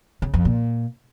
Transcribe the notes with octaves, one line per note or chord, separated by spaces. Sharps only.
C#3
F2
A#2